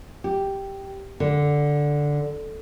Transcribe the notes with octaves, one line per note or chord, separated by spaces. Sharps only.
G4
D3